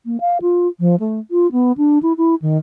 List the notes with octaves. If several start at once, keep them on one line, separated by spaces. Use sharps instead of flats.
A#3
F5
F4
F3
A3
F4
B3
D4
E4
E4
D#3